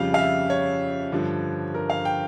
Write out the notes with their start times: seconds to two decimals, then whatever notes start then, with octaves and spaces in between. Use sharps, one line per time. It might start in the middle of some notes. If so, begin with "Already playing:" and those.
Already playing: F2 C#3 G3 F5
0.14 F5
0.18 E5
0.50 C#5
1.12 G2 D3 F3
1.74 A#4
1.90 F5
2.05 G5